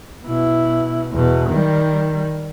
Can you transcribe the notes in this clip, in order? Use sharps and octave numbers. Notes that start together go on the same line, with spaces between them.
B2 E4
E2 B2
D#3 G3